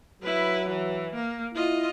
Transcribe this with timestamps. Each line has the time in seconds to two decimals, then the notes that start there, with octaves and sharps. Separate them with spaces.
0.22 F#3 E4 B4
0.69 E3
1.15 A#3
1.55 E4 F4 D#5